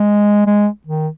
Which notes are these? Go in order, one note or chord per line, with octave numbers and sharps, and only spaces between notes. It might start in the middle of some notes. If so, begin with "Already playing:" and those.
Already playing: G#3
G#3
D#3